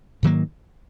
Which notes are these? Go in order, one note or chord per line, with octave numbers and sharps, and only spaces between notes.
G#2 D#3 F#3 A#3